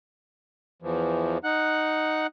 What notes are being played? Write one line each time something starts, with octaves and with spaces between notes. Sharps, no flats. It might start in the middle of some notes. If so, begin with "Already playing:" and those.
E2 E3 F3
D#4 F#5 F#6